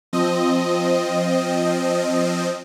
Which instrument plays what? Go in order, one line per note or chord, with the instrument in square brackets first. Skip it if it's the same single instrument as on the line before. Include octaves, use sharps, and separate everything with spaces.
[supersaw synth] F3 C4 D#5